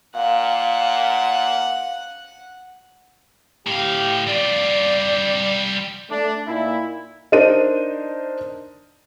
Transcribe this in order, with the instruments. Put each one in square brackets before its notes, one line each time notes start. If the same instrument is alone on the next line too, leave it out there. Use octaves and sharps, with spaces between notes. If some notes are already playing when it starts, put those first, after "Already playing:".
[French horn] A#2 [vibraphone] F5 [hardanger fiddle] F#5
[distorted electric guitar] A2 F5 [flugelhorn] G4
[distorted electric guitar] G3 F4 [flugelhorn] D5
[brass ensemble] A3 D4
A#2 D#4 E4
[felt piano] D4 D#4 A#4 C5 D#7